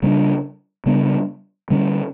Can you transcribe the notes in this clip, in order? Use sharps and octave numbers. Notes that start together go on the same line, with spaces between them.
C#3 G3 B3 D4
C#3 G3 B3 D4
D3 G3 C#4